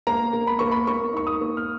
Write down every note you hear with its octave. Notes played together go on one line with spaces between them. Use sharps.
A#3 A#5
A#3
B5
A#3 C#6
B5
A#3 C#6
D#4 C#6
D#6
A#3
F6